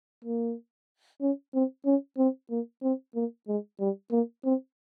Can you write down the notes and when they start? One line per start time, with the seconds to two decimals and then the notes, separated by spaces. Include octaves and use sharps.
0.24 A#3
1.21 C#4
1.54 C4
1.86 C#4
2.18 C4
2.50 A#3
2.83 C4
3.15 A#3
3.48 G#3
3.80 G3
4.11 A#3
4.45 C4